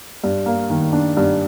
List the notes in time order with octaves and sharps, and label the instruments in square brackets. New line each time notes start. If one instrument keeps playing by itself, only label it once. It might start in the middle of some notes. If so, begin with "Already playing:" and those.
[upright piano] G2
A#3
D#3
D4
G2